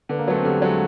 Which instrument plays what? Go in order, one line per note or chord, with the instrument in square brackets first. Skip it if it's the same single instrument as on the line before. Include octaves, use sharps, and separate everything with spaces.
[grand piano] D3 [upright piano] B3
[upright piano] A#3
[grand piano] F#3 A3 [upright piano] B3
[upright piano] C4
[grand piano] D3 [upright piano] G3
[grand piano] F#3 A3 [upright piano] G#3